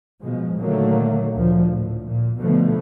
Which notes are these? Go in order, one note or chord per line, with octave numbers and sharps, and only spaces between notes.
B2 F3 G#3
A#2 D3 D#3 F#3 A3 A#3
D2 A#2 F3
A2
A#2
B2 D3 F3 A3 B3